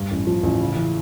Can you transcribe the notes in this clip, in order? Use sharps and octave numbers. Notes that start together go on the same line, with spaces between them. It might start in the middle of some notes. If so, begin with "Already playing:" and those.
Already playing: G2
A1
F3
A1
C#3
E3